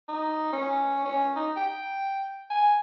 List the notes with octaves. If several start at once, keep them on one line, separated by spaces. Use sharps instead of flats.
D#4
C#4
C#4
D#4
G5
G#5